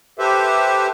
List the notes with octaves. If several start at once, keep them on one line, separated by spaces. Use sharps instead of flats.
G4 A4 B4 C5 E5